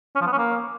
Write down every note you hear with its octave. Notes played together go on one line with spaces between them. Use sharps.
C#4
F3
B3
C#4
A#3